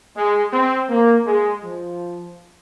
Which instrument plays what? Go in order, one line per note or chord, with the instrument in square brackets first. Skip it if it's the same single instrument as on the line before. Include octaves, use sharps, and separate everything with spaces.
[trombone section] G#3
C4
A#3
G#3
F3